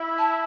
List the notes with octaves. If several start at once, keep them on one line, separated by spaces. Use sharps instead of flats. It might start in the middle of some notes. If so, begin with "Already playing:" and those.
Already playing: E4
A5